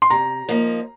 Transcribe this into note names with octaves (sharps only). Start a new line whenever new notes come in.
C6
C3 A#5
F3 A#3 D#4